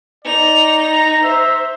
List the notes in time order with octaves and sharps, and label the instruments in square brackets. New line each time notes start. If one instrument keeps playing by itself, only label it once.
[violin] D#4 F7 [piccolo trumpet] D5
[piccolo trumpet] A#5
[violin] C5 [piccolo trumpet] E5